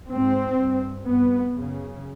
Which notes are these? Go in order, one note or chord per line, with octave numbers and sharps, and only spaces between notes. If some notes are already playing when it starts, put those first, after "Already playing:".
G#2 C4
G2
G2 B3
F#2 C#3